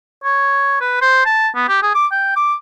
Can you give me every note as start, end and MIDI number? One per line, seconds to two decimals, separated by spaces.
0.24 0.79 73
0.81 1.01 71
1.01 1.23 72
1.26 1.48 81
1.56 1.68 59
1.69 1.80 67
1.82 1.91 68
1.95 2.06 86
2.12 2.32 79
2.36 2.54 86